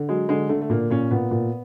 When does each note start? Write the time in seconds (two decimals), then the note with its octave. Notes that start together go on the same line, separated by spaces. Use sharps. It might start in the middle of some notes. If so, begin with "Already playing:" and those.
Already playing: D3
0.09 F#3 G#3
0.29 D3 G#3
0.49 D3 A3
0.61 A3
0.70 A#2 A#3
0.90 A#2 C#4
1.11 A#2 B3
1.31 A#2